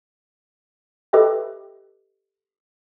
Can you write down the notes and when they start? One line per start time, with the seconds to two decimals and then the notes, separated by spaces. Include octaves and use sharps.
1.13 G4 A4 B4 D#5 E5 G5